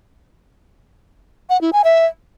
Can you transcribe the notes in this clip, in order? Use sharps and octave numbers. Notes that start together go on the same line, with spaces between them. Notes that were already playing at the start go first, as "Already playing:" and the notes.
F#5
E4
G#5
E5